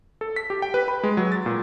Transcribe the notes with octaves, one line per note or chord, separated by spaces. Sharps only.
A4
B6
G4
G5
B4
B5
G#3
F#3
A6
A#2